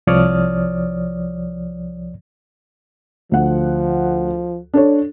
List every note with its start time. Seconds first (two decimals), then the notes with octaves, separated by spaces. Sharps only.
0.07 C2 F3 C#5 D5 D#6 F6
3.32 D2 F3 F#5
4.74 D4 A4 C#5